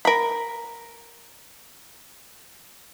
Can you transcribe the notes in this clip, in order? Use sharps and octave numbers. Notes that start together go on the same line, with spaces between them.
A#4 B5